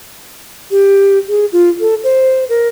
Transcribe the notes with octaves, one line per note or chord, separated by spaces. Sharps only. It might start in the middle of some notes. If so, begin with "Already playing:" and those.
G4
G#4
F4
A4
C5
A#4